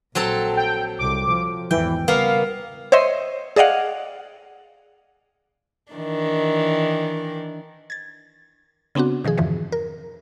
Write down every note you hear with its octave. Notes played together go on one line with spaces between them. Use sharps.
A#1 F#3 C4 A4
G5
C2 D6
F3
G#1 E2 E3 G5
C#3 G3 A#3 B3 F5
C5 C#5 D#5 E5 C6
G#4 D5 D#5 F5 F#5
D#3 E3 D4
G#6 A6
C#3 B3 C4 D4 F#4
B2 D#3 F3 G#4
F2 G#2 D3 E3 F3
A#4